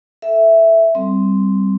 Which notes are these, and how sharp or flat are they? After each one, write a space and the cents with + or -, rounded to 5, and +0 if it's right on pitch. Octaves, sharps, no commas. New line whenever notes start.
A4 +0 E5 +0
G3 +0 C4 +0